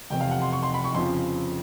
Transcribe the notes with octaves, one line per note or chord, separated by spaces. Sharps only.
F1 E2 C3 G5
F5
F#5
C6
C#6
C6
B5
C#6
F2 C#3 F3 C6